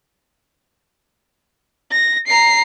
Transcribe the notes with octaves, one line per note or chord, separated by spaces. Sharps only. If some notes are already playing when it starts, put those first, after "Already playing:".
A#6
A#5 C7